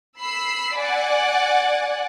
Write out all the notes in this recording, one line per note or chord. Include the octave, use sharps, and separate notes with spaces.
B5 E6 C7
D5 F#5 G#5